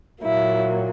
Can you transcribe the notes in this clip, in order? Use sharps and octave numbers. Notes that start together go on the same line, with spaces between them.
A#2 F#3 A#3 E4